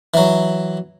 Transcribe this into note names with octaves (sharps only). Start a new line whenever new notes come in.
E3 F#3